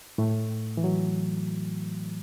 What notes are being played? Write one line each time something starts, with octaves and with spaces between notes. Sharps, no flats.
A2 A3
E3
F#3